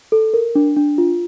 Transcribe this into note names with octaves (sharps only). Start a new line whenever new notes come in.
A4
A#4
D4
D4
F4